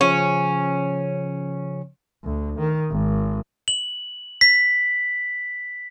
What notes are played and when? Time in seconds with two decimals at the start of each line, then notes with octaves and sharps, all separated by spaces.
0.01 C#3 F3 C#4
2.24 D2
2.58 D#3
2.91 G#1
3.68 F#7
4.41 B6